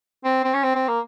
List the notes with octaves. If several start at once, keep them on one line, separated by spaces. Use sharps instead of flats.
C4
C4
C#4
C4
C4
A#3